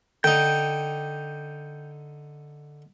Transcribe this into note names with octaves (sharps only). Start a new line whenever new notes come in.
D3 D#4 G5